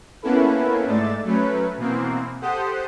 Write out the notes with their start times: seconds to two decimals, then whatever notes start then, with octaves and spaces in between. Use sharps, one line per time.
0.22 A#3 B3 C#4 E4 A4 B4
0.85 G#2 G#3 A3 D5 E6 A6
1.24 F#3 A3 C#4 B4
1.77 B2 E3 A#3 C4
2.41 G4 A4 C5 F#5 D#6 G6